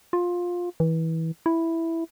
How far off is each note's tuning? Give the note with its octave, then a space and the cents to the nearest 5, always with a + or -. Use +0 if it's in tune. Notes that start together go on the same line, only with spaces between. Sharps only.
F4 +15
E3 -25
E4 +0